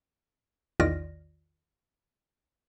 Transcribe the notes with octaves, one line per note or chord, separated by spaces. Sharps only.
A#1 E2 D#3 F4 D5 A#6